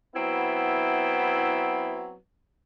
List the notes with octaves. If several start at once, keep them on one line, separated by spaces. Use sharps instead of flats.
F#3 B3 C4 E4